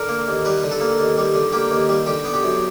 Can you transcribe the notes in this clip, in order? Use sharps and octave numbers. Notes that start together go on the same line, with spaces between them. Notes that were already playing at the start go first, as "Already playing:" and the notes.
Already playing: D3 A#4
A#3
D#2
G3 B4
D3
A4
A#3
D#2
G3
D3
A#3 G4
D#2
G3
D3 G4
B3
G4
F#2